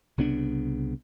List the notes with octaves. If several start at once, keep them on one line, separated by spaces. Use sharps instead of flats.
C2 C#3 B3 D4